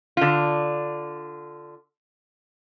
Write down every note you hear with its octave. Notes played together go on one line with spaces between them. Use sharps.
D3 F4